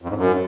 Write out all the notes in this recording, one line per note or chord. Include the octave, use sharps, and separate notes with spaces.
F2
G#2
F#2